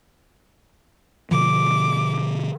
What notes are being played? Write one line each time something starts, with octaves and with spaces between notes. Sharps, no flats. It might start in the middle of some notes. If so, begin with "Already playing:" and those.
B2 D3 F3 D6